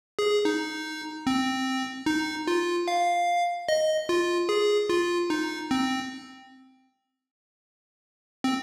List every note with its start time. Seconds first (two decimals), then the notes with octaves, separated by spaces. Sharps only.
0.19 G#4
0.45 D#4
1.27 C4
2.06 D#4
2.47 F4
2.88 F5
3.69 D#5
4.09 F4
4.49 G#4
4.89 F4
5.30 D#4
5.71 C4
8.44 C4